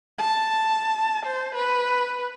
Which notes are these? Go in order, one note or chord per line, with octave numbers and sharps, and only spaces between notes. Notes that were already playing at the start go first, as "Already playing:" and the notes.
A5
C5
B4